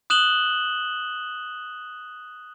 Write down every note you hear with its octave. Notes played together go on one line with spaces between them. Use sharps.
D#6 F#6 E7 F#7 G7